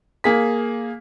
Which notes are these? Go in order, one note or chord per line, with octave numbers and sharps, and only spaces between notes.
A#3 G#4 B6